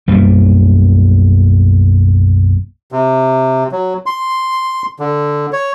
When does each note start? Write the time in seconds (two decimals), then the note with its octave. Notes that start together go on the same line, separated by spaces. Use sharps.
0.08 B1 F#2 G3 A#3
2.92 C3
3.72 F#3
4.06 C6
5.00 D3
5.53 C#5